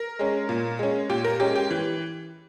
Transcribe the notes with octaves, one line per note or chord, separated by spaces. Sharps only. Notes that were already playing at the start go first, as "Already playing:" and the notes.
Already playing: A#4
G#3 C#4
A#2
G#3 C#4
A#2 G4
A#4
G#3 C#4 G4
G4
E3